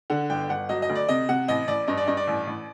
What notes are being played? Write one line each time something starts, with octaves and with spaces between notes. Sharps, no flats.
D3 F#5
G1 G5
G1 F#5
F#3 D#5
D#5
D2
D5
C3 D#5
C3 F#5
A1 D#5
A1 D5
G2 D#5
D5
G2 D#5
D5
A1
A1